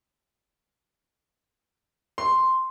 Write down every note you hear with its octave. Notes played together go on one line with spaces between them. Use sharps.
C6